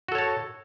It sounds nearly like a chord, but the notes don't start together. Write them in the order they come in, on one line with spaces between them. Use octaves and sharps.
F#4 A4 C#5 A5